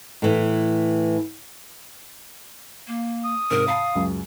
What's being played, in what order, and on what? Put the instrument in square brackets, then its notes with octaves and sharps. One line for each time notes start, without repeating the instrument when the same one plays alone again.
[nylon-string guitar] A2 E3
[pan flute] A#3
[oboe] D#6
[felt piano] G#2 C3 [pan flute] A#4
[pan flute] F5 [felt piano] A5 B5
[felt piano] C#2 F#2 G#3